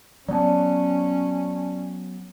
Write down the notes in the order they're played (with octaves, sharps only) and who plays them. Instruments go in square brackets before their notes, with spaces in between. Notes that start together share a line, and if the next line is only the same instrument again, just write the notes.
[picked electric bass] F#3 B3 [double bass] C#4 [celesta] D5 A5